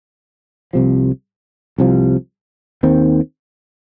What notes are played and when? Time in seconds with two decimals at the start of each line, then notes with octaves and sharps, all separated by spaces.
0.73 C2 C3 F3
1.78 C2 C3 F3
2.83 D#2 D#3 C4